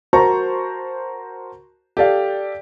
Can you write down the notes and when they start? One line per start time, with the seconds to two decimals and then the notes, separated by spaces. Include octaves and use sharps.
0.13 F#4 A#4 C5 A5 A#5 C#6
1.97 G4 A4 D5 F5